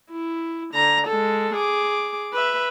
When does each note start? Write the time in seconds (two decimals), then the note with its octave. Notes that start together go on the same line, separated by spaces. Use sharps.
0.10 E4
0.74 D3 A#5
1.07 G#3 A4
1.55 G#4 D6
2.33 B4 E5